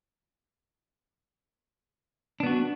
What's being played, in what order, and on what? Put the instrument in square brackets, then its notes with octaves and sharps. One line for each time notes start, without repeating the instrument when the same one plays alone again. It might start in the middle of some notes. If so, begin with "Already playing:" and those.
[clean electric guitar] D4
B3
F#4